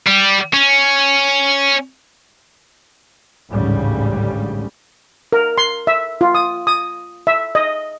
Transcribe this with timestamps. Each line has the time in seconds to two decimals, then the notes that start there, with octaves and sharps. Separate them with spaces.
0.07 G3
0.54 C#4
3.50 A1 D2 G#2 C#3 G3
5.33 A#4
5.58 C6
5.87 E5
6.21 F4
6.35 D#6
6.67 D#6
7.27 E5
7.55 D#5